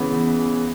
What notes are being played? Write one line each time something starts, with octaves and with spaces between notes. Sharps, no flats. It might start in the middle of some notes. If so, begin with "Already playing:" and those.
Already playing: C#3 E3 B3